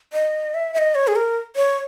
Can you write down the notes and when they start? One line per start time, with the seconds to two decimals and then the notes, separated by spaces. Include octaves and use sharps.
0.13 D#5
0.54 E5
0.74 E5
0.78 D#5
0.95 C#5
1.07 G#4
1.16 A#4
1.56 C#5